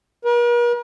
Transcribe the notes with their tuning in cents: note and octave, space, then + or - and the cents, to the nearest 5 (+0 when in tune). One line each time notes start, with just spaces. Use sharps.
A#4 +45